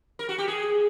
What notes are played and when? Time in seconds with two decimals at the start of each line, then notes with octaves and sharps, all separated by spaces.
0.19 A#4
0.29 F#4
0.38 G4
0.48 G#4